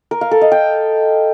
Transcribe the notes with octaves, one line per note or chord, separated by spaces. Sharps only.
A#4
F5
A4
D#5
G5